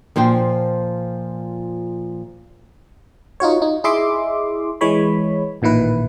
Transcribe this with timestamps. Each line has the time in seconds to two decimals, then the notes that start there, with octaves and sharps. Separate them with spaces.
0.16 A#2 F3 C5 G5
3.40 D#4 F4 F#4 C#5
3.62 D#4
3.84 E4 G#4 D#5 E5 C6 D6
4.81 E3 G#3 C#5 B5
5.62 A1 A#2 D#3 E4 B4